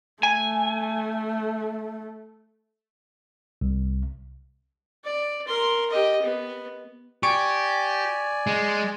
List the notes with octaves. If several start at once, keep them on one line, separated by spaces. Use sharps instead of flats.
A3 G#5
C2
D5
A#4 C6
G4 D#5
B3
G4 D5 G#5 C#6
G#3